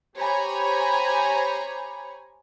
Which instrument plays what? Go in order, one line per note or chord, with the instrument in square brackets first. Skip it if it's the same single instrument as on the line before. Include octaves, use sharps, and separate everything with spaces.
[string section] G4 C5 C#5 G#5 A#5 B5